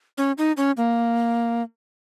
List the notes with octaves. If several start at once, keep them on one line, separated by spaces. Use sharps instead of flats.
C#4
D#4
C#4
A#3